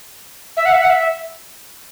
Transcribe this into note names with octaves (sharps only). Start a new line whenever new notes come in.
E5
F#5
E5
F#5
E5